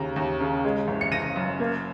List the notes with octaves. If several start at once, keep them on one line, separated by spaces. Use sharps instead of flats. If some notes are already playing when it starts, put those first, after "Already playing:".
Already playing: D#2 C#3 A#5
D#2
C#3
G#3
F#1
C#7
F#1 A#6 D#7
F#2
A#3